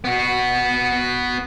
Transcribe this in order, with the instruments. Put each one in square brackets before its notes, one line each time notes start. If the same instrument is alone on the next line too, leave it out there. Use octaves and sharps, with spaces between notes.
[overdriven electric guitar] B3 F#4